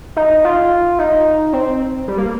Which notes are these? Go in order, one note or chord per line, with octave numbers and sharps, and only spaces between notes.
D#4
F4
D#4
C4
G3
A#3